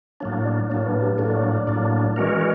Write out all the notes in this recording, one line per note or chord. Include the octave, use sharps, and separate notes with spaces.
A2 F#3 A#3 D4 C#5
D5
A2 F#3 A#3 D4 C#5
B4
G4
A2 F#3 A#3 D4 A4
D5
C#5
D5
A2 F#3 A#3 D4 D5
E3 G#3 C#4 F#4 A#4 D5